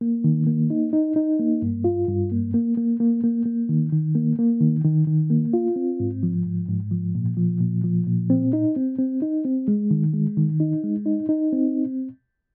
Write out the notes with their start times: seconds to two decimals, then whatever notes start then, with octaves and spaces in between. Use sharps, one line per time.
0.01 A#3
0.24 D#3
0.47 A#3
0.70 D#4
0.93 D#4
1.16 D#4
1.39 A#3
1.62 G2
1.84 F4
2.08 G2
2.32 A#3
2.54 A#3
2.77 A#3
3.00 A#3
3.24 A#3
3.46 A#3
3.69 D#3
3.92 D#3
4.15 A#3
4.39 A#3
4.61 D#3
4.84 D#3
5.07 D#3
5.30 A#3
5.53 F4
5.76 C4
6.00 G#2
6.23 F3
6.46 G#2
6.69 G#2
6.91 F3
7.15 A#2
7.37 F3
7.61 A#2
7.84 F3
8.07 A#2
8.30 C4
8.53 D#4
8.76 C4
8.98 C4
9.22 D#4
9.45 C4
9.68 G#3
9.91 D#3
10.13 G#3
10.37 D#3
10.60 D#4
10.84 G#3
11.06 D#4
11.29 D#4
11.53 C4